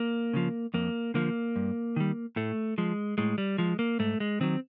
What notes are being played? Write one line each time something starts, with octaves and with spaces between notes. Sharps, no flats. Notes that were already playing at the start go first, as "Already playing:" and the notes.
Already playing: A#3
C#3 F3
F2 A#3
D3 F3 A#3
G2
D#3 G3
A2 A3
F3 G#3
A2 G#3
G3
F3 G#3
A#3
G#2 A3
G#3
D#3 F#3 C4